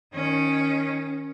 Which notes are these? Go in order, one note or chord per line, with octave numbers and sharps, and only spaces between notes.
D#3 C#4